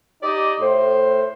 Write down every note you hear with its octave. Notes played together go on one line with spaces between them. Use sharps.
D#4 G4 D5 D#5
A2 C5